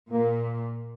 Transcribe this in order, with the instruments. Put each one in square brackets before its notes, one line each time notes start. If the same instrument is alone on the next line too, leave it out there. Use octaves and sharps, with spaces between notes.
[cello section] A#2 [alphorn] A#3